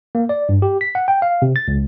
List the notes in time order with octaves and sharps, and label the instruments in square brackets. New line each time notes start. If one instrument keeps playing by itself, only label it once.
[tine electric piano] A#3
D5
G2
G4
B6
F#5
G5
F5
C3
A6
C#2